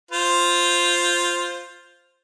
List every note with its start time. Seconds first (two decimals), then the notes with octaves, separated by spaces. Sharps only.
0.11 F4 C5